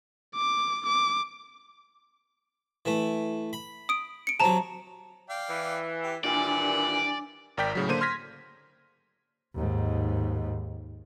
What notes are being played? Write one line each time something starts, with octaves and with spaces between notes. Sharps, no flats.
D6
D6
E3 A3
B5
D#6 D7
C#7 D7
C3 F#3 A5 A#5
D5 F5 G5
E3
G4
D#2 A#2 E3 G3 D4 D5 G#5
G#1 A#4 D5 G5 G6 B6
A2 C#3 F#3
D3 A#3 C5 D#7
C6 F6 G#6 A#6 B6
D#2 G#2